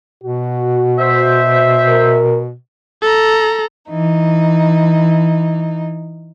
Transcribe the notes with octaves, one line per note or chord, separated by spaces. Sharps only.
B2 F#4
C5 E5
A#4
A4 A#5
E3 D#4